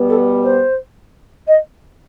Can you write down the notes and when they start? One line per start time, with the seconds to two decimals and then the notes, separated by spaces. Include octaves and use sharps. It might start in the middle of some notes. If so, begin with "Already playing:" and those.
Already playing: B2 G3 B3
0.08 A4
0.43 C5
1.47 D#5